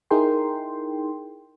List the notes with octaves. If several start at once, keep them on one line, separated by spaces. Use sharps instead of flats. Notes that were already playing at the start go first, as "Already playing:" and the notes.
D#4 E4 G#4 A#4 G5 C6